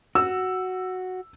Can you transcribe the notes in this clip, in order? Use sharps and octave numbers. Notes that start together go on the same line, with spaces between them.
F#4 E6